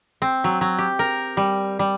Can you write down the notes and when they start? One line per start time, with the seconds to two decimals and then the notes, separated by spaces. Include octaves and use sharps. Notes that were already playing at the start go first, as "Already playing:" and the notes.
0.22 C4
0.44 F#3
0.61 F#3
0.78 G4
0.99 A#4
1.37 G3
1.79 G3